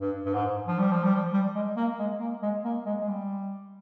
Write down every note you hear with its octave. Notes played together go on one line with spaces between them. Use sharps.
G2
G2
G#2
F3
G3
F3
G3
F3
G3
G#3
A#3
G#3
A#3
G#3
A#3
G#3
G#3
G3